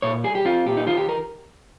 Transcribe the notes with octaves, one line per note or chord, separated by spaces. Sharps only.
A#2 C#5
G3 G#4
G4
C4 F4
A#2 G4
D#4
D#3 F4
G4
A#4